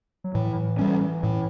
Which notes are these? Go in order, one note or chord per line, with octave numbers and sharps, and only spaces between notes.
F#3
A2 E3
G3 C#4
A2